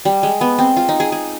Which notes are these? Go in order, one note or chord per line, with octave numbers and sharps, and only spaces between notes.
G3
G#3
B3
C4
F4
D#4
G#4
G#4